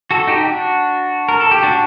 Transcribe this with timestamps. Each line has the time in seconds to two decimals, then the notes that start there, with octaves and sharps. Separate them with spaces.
0.11 F#4 A4
0.27 D#4 G4
0.41 G4
0.45 D4 F#4
1.28 A#4
1.40 A4
1.51 G4
1.63 D4 F#4